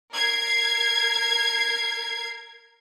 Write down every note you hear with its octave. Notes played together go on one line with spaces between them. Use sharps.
A#4 G#6 C7